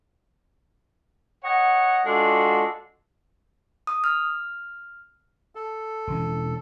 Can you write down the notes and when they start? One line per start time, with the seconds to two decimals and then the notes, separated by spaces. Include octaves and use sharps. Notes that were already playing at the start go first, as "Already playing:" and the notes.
1.44 C#5 D#5 F#5
2.06 G#3 D4 F4 F#4 A4
3.87 D#6
4.04 F6
5.55 A4
6.07 E1 E3 C#4